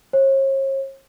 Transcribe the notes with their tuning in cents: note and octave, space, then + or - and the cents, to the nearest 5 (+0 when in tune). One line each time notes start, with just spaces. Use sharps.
C#5 -45